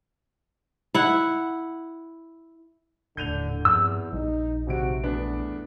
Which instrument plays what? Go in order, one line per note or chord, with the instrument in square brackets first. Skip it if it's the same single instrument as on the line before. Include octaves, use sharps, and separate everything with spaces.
[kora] E4 F#5
[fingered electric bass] D#1 A2 [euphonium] D3 [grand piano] G6 D#7 F7
[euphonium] E2 [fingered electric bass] G2 F3 C4 [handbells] E6
[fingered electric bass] A#1 G3 [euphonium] D#4
[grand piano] G#1 C3 D7 [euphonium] F#4
[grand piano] E2 B3 D4 [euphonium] A3